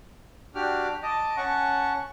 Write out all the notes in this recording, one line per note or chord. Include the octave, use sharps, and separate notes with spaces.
D4 F#4 G4 G5 D6 F6
D#5 A5 D6
C#4 F#5 A5 C#6